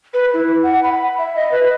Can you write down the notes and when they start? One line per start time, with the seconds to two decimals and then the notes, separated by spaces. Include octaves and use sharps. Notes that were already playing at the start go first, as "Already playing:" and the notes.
0.14 B4
0.34 E4
0.63 F#5
0.83 B5
1.18 E5
1.36 D#5
1.51 B4